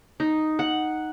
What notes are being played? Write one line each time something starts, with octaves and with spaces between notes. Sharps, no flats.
D#4
F#5